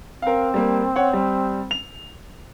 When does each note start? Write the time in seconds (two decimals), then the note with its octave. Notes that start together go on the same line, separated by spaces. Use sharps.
0.22 C4 A#4 F5
0.54 G3 A#3
0.96 C#5 F#5
1.13 G3
1.71 F7